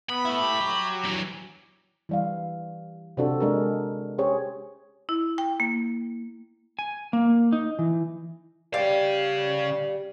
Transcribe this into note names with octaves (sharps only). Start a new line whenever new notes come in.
B3 B5
A3 E4
G4
F#3
D3 E3
E3 G3 F5
C3 C4 D4 F#4 A4
G#3 D4 G#4 A#4
C#4 G4 G#4 C5 C#5
E4
G5
A#3
G#5
A#3
D#4
E3
C#3 G3 F5